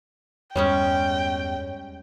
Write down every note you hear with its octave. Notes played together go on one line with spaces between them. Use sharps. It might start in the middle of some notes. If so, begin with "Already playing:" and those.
E2 G2 G3 G#3 C#4 C#5 G5